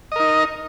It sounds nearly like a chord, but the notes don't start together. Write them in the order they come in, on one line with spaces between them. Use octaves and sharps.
D#5 A#4 D#4